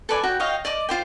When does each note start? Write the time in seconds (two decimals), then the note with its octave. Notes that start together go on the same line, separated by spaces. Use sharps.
0.09 A4 B4 D5 G#5
0.23 F#4 G5
0.40 C#5 D#5 F5 G5
0.65 D5 D#5 D6
0.89 F4 C5 G5